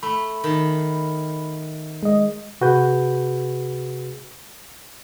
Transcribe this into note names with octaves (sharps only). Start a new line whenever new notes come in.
A3 B5
D#3 A5
G#3 D#5
C3 F#4 G#4 B4 G6